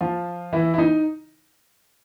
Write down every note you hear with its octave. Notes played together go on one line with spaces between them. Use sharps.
F3 F4
E3 E4
E4
D#4